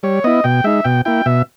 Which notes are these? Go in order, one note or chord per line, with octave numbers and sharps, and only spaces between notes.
G3 C#5
B3 E4 D#5
B2 G5
G#3 D#4 E5
B2 G5
A#3 E4 G5
B2 E5